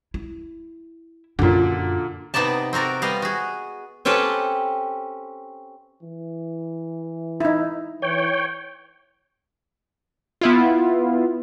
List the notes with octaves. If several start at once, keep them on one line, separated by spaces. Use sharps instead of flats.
E4
F#2 A#2 D3 F4
C3 B3 D#4 D5 A5
C4 F#4 A#4 D5
G3 B3 D#5 F5
F#4 G#4
C4 C#4 G4 A4 B4
E3
D#4 E4
E3 C#5 G5
B3 E4 F4